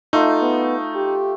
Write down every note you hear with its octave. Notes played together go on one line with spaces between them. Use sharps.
A3 D#4 F4
B3
G4